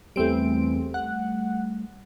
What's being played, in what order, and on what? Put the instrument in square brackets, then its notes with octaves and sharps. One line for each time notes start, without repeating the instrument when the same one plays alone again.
[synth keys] E2 C4 D7 [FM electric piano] G3 A3
[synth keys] F#5